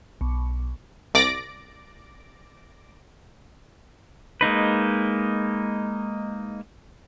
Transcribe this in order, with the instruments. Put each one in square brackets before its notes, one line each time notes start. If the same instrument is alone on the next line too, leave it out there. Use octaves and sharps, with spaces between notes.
[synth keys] B1
[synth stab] C2 D5 D6 A#6 D7
[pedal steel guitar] G#3 A#3 D#4 B4